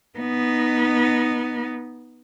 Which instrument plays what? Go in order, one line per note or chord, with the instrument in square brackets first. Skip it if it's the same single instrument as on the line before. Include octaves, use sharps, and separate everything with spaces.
[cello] B3 D#4